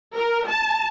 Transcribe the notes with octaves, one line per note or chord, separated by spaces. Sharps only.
A#4
A5